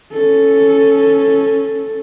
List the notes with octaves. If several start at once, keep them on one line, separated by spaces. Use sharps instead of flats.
C#4 A4